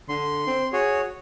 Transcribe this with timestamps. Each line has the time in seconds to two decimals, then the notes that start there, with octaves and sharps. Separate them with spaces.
0.09 D3 C6
0.47 C4
0.73 F#4 G#4 C#5